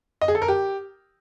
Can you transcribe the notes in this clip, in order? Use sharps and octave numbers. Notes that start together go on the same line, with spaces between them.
D#5
G#4
A4
A#4
G4